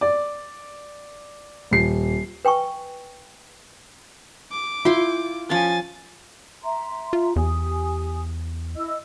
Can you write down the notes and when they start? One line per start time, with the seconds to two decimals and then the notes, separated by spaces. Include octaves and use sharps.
0.01 D5
1.71 D#1 C7
2.45 B4 G5 G#5 C#6
4.52 D6
4.85 E4 F4 G5 C6
5.50 F3 C#4 G#5 A6
6.63 E5 A#5 C6
7.13 F4
7.36 E2 G4 G#5 D#6
8.76 E4 D#5 E6